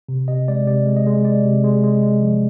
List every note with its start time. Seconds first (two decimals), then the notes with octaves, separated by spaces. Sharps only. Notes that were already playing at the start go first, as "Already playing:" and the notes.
0.09 C3
0.28 C3 D#5
0.48 G#3 D5
0.67 C3 D5
0.86 G#3
0.96 D#5
1.06 G#3
1.25 G#3 D5
1.45 C3
1.64 G#3
1.84 G#3
2.03 G#3
2.22 F3